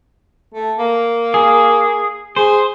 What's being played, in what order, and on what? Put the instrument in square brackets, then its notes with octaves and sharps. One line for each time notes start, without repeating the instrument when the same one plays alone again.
[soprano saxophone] A3
A#3
[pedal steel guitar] G#4
[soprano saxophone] G#4 [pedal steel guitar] C5